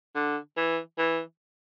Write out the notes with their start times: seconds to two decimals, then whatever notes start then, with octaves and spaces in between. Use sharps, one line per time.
0.15 D3
0.57 E3
0.98 E3